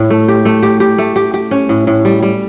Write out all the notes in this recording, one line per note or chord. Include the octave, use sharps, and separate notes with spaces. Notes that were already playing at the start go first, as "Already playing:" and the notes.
Already playing: A2
A3
G4
A3
G4
G4
A3
G4
G4
C#4
A2
A2
G3
G3